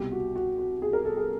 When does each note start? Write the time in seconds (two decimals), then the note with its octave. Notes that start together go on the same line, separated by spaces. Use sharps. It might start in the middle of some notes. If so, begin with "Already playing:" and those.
Already playing: C2 B2 G4
0.12 F#4
0.36 F#4
0.58 F#4
0.82 G#4
0.93 A#4
1.05 A4
1.17 G#4